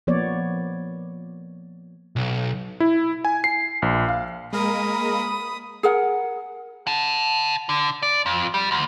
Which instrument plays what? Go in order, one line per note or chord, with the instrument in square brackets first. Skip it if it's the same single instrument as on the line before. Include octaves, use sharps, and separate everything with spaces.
[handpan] F3 A#3 B3 C#5 D5
[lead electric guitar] B1
[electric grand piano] E4
G#5
C7
A#1
F5
[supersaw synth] G#3 A#3 A#4 [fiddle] B5 D#6
[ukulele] G#4 A#4 F#5
[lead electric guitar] F#5 A5
D3
D5
F2
G3
D2